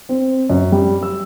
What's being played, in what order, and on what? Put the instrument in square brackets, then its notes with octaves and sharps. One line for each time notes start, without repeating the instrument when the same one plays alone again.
[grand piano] C4
F#2
G3
E6